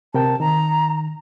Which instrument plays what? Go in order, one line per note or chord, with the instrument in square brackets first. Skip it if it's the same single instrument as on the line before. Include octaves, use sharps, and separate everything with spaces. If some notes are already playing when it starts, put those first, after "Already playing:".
[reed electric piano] C3 A#4 G5 [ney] A5
[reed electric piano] D#3 [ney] A#5